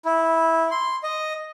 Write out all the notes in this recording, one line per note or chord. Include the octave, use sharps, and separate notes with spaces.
E4
C6
D#5